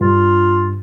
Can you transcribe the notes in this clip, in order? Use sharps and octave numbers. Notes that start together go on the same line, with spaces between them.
G2 F4